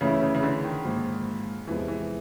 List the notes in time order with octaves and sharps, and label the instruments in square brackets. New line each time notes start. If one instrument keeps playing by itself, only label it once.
[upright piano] C#3 [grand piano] E3 A3 C#4 E4
[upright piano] C#3
C#3
D3
D#3
[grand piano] G#2 F3 A#3
[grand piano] E2 C3 F3 G#3 [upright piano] E3
[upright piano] E3